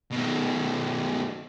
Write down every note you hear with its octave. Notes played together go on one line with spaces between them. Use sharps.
B2 D#3